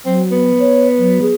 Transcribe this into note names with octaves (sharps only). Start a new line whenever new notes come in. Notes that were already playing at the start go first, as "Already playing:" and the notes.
F#3 C4
B3
C#5
F#3
G#4